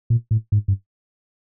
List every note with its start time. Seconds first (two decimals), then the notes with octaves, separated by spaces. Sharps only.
0.10 A#2
0.31 A2
0.52 G#2
0.68 G2